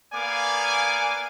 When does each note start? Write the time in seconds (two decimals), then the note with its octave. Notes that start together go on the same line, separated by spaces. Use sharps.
0.14 A#3 B3 D5 F5 G#5 D6